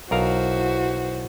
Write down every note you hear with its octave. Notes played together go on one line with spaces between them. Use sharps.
B1 E4 F#4 A#4 C5 F5